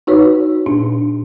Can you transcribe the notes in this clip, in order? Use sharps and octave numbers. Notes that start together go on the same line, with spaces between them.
D#4 F#4 B4 C#5
A#2 D4